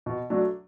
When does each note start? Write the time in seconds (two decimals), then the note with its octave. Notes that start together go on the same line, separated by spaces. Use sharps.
0.06 B2
0.30 F#3 A3 D4